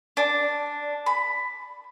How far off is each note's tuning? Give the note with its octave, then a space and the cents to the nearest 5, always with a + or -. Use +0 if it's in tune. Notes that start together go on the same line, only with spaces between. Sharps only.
D4 -5
B5 +10